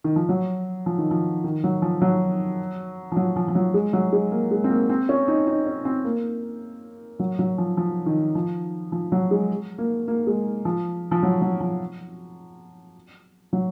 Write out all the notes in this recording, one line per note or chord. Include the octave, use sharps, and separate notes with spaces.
D#3
F3
F#3
F3
D#3
F3
D#3
F#3
F3
F#3
F3
F#3
F3
F3
F#3
G#3
F#3
G#3
A#3
G#3
C4
A#3
C4
C#4
D#4
D#4
C#4
C4
A#3
F#3
F#3
F3
F3
D#3
F3
F3
F#3
G#3
A#3
A#3
G#3
F3
F3
F#3
F#3
F3
F#3